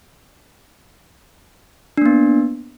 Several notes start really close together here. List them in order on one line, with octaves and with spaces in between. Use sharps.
D4 A#3 B3